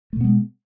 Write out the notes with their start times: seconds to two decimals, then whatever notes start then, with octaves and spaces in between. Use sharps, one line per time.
0.13 A3
0.17 B2
0.21 B3
0.25 G#3